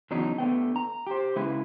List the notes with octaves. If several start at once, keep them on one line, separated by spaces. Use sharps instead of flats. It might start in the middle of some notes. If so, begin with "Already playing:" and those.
E2 C#3 F#3 D4 D#4
D3 A3 B3 G5
A#5
G4 C5
C#3 G#3 E4 B4